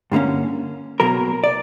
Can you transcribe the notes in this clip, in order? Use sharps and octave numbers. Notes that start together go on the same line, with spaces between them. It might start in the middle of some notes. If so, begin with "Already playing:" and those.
G2 D3 F#3 A#3 C#4
B1 B2 F#3 A#3 A#4
D5